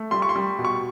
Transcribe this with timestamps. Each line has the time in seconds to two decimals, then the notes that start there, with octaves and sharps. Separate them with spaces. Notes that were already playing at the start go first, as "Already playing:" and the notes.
Already playing: A3
0.11 G3 C6
0.22 C#6
0.29 C6
0.36 G3
0.59 B2
0.65 C#6